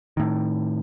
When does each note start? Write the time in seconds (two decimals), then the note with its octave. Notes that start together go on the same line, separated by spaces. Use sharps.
0.17 A2 D#3